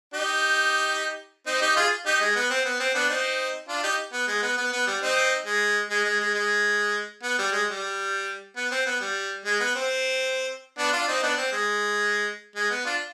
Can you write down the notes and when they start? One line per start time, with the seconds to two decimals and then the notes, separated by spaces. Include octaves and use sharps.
0.13 D#4 G4
1.46 C4 D#4
1.61 D#4 G4
1.76 F4 G#4
2.06 D#4 G4
2.21 G#3
2.36 B3
2.50 C4
2.65 B3
2.80 C4
2.95 B3 D4
3.09 C4 D#4
3.69 D4 F4
3.83 D#4 G4
4.12 B3
4.27 G#3
4.42 B3
4.58 B3
4.72 B3
4.87 G3
5.01 C4 D#4
5.46 G#3
5.90 G#3
6.05 G#3
6.20 G#3
6.34 G#3
7.23 B3
7.38 G3
7.52 G#3
7.68 G3
8.56 B3
8.71 C4
8.86 B3
9.01 G3
9.45 G#3
9.60 B3
9.75 C4
10.78 B3 D4
10.93 D4 F4
11.08 C4 D#4
11.22 B3 D4
11.37 C4
11.52 G#3
12.56 G#3
12.70 B3
12.85 D4 F4